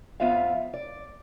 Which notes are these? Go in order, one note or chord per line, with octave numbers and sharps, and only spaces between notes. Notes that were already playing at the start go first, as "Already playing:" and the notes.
F2 B3 F4 E5 F5
D5